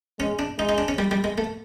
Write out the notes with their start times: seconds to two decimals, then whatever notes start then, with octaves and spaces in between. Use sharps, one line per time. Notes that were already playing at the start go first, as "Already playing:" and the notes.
0.19 G#3 C#4
0.39 D4
0.59 G#3 D#4
0.69 D#4
0.78 D4
0.88 C#4
0.98 G3
1.11 G3
1.24 G#3
1.38 A3